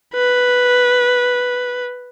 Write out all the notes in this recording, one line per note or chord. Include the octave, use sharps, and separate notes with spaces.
B4